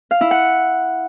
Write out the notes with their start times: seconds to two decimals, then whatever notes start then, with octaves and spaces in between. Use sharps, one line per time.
0.11 F5
0.21 E4
0.31 F#5